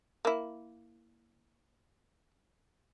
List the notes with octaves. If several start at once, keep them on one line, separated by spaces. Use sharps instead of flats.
A#3 E4